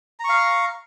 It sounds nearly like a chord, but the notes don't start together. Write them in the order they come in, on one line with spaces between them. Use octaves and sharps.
A#5 C#6 F5